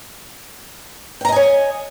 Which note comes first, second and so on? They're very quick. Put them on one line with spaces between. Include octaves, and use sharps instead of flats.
G5 A#5 D#5 G#5 C#5